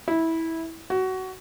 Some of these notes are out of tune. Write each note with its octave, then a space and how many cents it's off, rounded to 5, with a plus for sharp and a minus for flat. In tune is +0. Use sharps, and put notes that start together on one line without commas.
E4 -15
F#4 +20